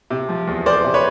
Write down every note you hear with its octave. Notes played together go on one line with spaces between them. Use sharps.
C3
F3
E2
E2 C5 D5
C3
B4 C#5